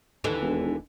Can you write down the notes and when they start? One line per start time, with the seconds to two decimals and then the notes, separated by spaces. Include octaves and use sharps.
0.24 D#2 D3 E3
0.41 E1